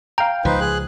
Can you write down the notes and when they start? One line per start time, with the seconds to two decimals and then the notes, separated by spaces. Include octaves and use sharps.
0.18 F5 G5 A#5
0.45 C#2 F3 D#4 B4 C5
0.60 G#4 F#6